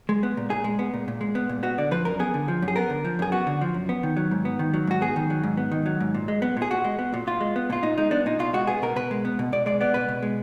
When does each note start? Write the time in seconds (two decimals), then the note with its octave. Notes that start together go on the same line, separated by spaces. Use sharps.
0.09 G#3
0.23 B3
0.37 A#2
0.50 A#2 G#4
0.64 G#3
0.79 B3
0.94 A#2
1.08 A#2
1.21 G#3
1.35 B3
1.49 A#2
1.63 B3 F#4
1.78 D3 D5
1.91 F3 B4
2.05 F#2 A#4
2.19 B3 G#4
2.34 D3
2.48 F3
2.62 F#2
2.68 G#4
2.76 B3 A#4
2.90 D3
3.05 F3
3.19 F#2 G#4
3.32 B3 F#4
3.47 D3
3.61 F3
3.74 F#2
3.89 B3
4.03 D#3
4.17 F#3
4.31 G#2
4.45 B3
4.59 D#3
4.74 F#3
4.87 G#2 F#4
5.01 B3 G#4
5.16 D#3
5.30 F#3
5.43 G#2
5.57 B3
5.72 D#3
5.86 F#3
6.00 G#2
6.14 A#2
6.28 G#3
6.42 B3
6.57 A#2
6.62 G#4
6.71 A#2 F#4
6.84 G#3
6.99 B3
7.14 A#2
7.27 A#2 F4
7.41 G#3
7.56 B3
7.70 A#2 F4
7.83 A#2 D#4
7.98 G#3 D#4
8.11 B3 D4
8.26 A#2 D#4
8.39 B2 F4
8.53 G#3 F#4
8.67 B3 G#4
8.82 B2 A#4
8.96 B2 B4
9.11 G#3
9.25 B3
9.39 B2
9.52 B2 D5
9.66 G#3 D5
9.81 B3 D5
9.94 B2 B4
10.09 B2
10.22 G#3